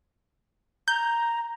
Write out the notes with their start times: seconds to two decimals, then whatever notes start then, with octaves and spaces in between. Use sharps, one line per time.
0.88 A#5 G6